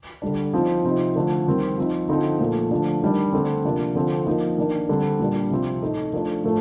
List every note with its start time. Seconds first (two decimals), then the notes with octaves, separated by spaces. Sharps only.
0.22 D3 G3 D4
0.54 F3 C4 D#4
0.85 C3 F3 C4 D#4
1.15 D3 F3 A3
1.47 D#3 G3 C4
1.78 F3 C4 D#4
2.09 D3 F3 C4 D#4
2.40 A#2 F3 A3
2.71 D3 F3 A3 D4
3.01 D#3 G3 D4
3.33 D3 A3 C4
3.64 C3 F3 A#3 D4
3.96 D3 F3 C4
4.26 F3 A#3 D#4
4.57 D#3 A#3 D4
4.89 D3 G3 C4
5.19 A#2 G3 A#3 D4
5.50 C3 F3 C4
5.82 A2 A3 D#4
6.13 F3 A3 D4
6.44 A2 F3 A3